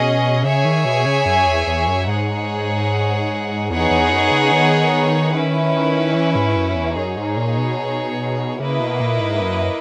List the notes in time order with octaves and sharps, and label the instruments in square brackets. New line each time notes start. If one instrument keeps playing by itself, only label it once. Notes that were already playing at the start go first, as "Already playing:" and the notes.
Already playing: [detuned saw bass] B2 [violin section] C#4 G#4 D#5
[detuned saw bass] C#3 [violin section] G#4 C#5 E5 G#5
[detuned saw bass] D#3
B2
C#3
F#2
E2
E2
F#2
[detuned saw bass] G#2 [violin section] D#4 G#4 C#5 F#5
[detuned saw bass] E2 [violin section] B3 D#4 G#4 C#5 F#5
[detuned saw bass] E2
F#2
C#3
D#3
[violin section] C#4 E4 B4
[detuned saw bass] E3
G#2
F#2
E2
[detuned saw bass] F#2 [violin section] D#4 G#4 C#5
[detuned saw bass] G#2
A#2
B2
[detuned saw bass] C#3 [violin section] A#3 E4 B4 D#5
[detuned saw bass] B2
A#2
G#2
F#2